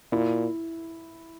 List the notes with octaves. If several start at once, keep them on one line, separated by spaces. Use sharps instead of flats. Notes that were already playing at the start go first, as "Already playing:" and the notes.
A#2 E4